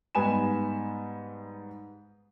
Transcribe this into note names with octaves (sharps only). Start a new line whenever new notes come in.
G#2 G3 B3 G#5 B5 E7